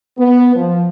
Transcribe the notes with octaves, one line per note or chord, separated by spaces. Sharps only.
B3
F3